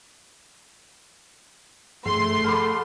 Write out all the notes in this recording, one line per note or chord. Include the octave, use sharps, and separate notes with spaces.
G2 F3 A3 G#4 C6
G#4 A4 F#5 A5 B5 D6